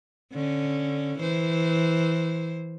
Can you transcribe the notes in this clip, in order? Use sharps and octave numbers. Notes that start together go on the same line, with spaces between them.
D3 C#4
E3 C5